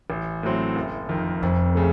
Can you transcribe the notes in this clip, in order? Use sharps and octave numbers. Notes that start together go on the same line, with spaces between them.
A1
A2 F#3 C4
F#1
F2 D#3
F1 F2
C#3 A3